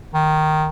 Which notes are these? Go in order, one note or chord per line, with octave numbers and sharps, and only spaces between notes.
D#3